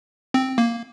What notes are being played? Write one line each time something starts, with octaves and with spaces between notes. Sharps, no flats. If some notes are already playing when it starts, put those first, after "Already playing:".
C4
A#3